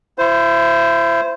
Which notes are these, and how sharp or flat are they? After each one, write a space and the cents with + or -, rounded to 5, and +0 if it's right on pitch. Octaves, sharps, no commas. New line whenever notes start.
E4 +30 C5 -5